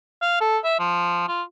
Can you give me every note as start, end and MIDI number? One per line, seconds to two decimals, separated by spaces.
0.22 0.38 77
0.41 0.58 69
0.64 0.79 76
0.79 1.28 53
1.28 1.43 65